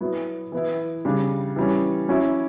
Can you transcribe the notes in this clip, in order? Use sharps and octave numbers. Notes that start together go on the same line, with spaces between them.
F#3 B3 E4
E3 B3 E4
C#3 G3 D4
E3 G3 C#4
F#3 C#4 E4